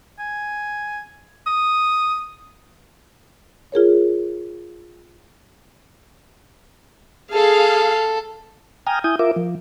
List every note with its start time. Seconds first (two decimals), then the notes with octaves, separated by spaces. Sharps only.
0.19 G#5
1.47 D#6
3.72 F4 G#4 A#4 C#5
7.33 G#4 A4 F5
8.87 G5 G#5 A#5 D#6 F6
9.04 E4 G#5 D#6 G6
9.19 F4 A#4 E5 D6
9.36 F3